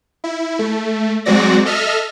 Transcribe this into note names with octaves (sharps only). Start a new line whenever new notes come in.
E4
A3
F#3 G#3 C4 F#4 D5 A#6
A4 D#5 E5 F6